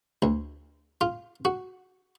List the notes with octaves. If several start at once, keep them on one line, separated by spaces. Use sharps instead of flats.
D2
F4
F#4